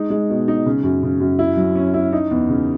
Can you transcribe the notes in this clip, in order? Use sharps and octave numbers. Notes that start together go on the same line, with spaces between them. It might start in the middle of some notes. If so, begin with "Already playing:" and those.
Already playing: G#3 D#4
G#3
B2
D#4
C#3
F#2
C#3
F#2
E4
F#3
C#4
E4
D#4
E2
C#3